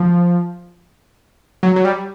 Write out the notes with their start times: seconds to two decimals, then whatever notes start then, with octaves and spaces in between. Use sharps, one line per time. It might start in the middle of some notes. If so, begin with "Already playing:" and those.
Already playing: F3
1.63 F#3
1.76 F#3
1.85 G3